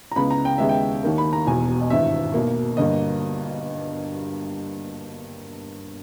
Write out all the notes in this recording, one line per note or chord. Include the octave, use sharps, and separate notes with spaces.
A#5
C#2 C#3 G#3 B3 B5
A#5
G5
D#2 C#3 G#3 B3 E5
G5
D#2 D#3 A#3
B5
A#5
E1 E2 B2 G#5
D#5
G#1 G2 E3 E5
B1 B2 A#3
G1 G2 G3 A#3 D#5